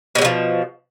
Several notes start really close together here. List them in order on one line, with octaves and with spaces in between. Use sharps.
B2 G3 D3 F3